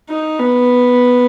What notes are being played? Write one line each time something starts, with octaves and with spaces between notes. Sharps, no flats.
D#4
B3